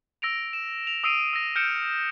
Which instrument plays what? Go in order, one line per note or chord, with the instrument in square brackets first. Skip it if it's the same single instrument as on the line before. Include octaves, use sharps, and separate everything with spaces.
[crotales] E6 A#6 D7 F7
E7
F7
D#6 E6 C7 D7 D#7 F7
E6 A#6
F6 G6 C#7 D7 E7